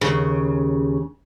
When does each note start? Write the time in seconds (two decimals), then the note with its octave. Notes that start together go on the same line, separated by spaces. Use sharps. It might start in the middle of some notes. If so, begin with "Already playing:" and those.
0.01 D#2 C#3